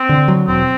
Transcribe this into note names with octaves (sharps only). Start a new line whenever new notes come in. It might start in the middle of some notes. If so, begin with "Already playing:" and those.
Already playing: C4
D3
F#3
E1 C4